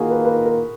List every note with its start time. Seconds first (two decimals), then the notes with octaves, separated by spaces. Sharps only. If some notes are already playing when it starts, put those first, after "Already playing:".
Already playing: D#3 A#3 F4 F#4 G#4
0.10 B4
0.25 B4
0.46 A#4